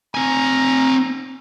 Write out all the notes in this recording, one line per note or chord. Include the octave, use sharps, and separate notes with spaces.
C4 G#5 A#5